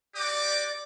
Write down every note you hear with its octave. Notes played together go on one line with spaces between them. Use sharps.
F#4 G4 D5 D6